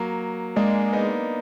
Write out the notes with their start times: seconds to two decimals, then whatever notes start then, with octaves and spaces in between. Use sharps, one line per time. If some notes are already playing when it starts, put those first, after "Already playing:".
Already playing: F#3 A#3
0.56 G#3 A#3 D4
0.93 B3 D#4